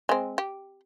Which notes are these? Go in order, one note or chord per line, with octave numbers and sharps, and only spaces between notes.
G#3 C4
G4